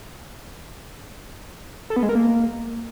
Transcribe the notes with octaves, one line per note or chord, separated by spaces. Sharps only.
A4
B3
G#3
A#4
A#3